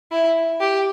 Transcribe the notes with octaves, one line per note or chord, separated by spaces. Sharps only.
E4
G4